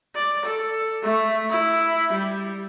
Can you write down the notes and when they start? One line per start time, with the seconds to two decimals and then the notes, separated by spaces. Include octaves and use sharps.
0.15 D5
0.45 A4
1.03 A3 E5
1.50 E4
2.12 G3